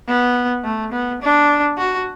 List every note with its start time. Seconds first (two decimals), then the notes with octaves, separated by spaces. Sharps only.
0.08 B3
0.64 A3
0.92 B3
1.22 D4
1.78 F#4